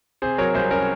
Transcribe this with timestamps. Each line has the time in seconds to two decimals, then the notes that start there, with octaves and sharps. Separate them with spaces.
0.22 C3 G#4 C5
0.38 F#3 A#4 C#5
0.55 C2 G#4 C5
0.71 C#4 A#4